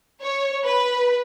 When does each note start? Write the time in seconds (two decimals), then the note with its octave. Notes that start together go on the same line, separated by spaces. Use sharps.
0.21 C#5
0.66 B4